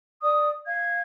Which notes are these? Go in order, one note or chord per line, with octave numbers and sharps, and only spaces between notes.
D5 D#6
F5 G#6